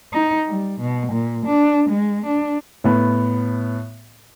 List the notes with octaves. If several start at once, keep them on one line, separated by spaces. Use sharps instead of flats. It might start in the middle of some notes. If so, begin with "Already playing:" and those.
D#4
G3
B2
A#2
D4
G#3
D4
A2 B3